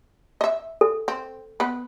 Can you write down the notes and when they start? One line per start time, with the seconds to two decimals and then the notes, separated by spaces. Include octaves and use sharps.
0.41 D#5 E5
0.81 A4
1.08 C4
1.60 B3 B4